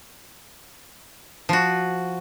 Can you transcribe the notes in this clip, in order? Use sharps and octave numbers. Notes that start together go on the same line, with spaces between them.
F3 F#4